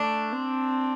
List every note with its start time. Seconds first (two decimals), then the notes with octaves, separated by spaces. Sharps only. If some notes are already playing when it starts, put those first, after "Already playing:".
Already playing: A3 D4
0.32 C4